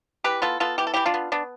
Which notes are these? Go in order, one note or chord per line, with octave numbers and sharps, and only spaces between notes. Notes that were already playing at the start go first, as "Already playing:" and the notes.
E3 G4 B4
B3 F4 A4
B3 F4 A4
E3 G4
A4
E3 E4 G4
D4 F4
B3
B3 D4